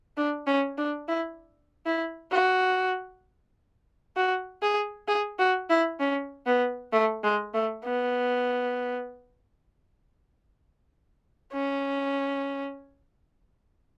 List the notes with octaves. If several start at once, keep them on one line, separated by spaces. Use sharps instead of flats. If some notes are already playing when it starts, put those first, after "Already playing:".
D4
C#4
D4
E4
E4
F#4
F#4
G#4
G#4
F#4
E4
C#4
B3
A3
G#3
A3
B3
C#4